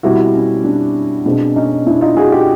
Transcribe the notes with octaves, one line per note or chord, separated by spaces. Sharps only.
B2 G3 C4 E4 F#4
C#4
D4
B2 G#3 C4 D4
C#4 D#4
D4 E4
D#4 F4
F#4 G#4
F4 G4